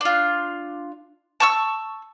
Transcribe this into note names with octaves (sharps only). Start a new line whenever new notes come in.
D4 F4
A5 C#6 E6